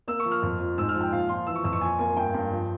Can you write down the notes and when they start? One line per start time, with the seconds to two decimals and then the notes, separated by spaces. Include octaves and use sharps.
0.08 A#3 E6
0.20 C#6
0.25 F3
0.31 F6
0.42 F2
0.60 F3
0.78 G#2 E6
0.89 F6
0.95 F3
1.01 G5
1.12 A#2 F5
1.29 F3 C6
1.47 E3 E6
1.56 C#6
1.64 F2 E6
1.73 C#6
1.81 A#2 G#5
1.99 A#3 G#5
2.16 G2 G5
2.34 G2
2.51 F3